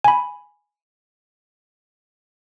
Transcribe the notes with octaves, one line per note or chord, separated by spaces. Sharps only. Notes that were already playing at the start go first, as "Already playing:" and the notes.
G#5 B5